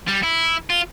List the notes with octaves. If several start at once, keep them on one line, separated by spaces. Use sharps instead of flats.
G3
E4
F4